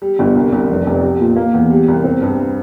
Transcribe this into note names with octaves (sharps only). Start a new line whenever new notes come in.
G3
G1
C2
C2
F1
F1
G4
A#2
A#3
E2
G3
C2
C4
G2